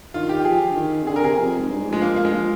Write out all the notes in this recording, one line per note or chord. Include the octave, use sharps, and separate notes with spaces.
D#3 F4
G4
F3 G#4
F3
D3
D#3
C3
D3 G#4
A#4
C3 G#4
F2
G#2
G2
G#2
F3 G#3
A#3
A#3
G#3
F3 A#3